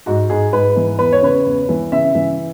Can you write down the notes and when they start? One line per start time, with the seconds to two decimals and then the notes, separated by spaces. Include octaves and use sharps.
0.06 G#2 F#4
0.30 G#2 G#4
0.52 G#2 B4
0.76 E3
0.99 E2 B4
1.12 C#5
1.23 C#3 B4
1.45 E2
1.69 E3
1.92 C#3 E5
2.15 E3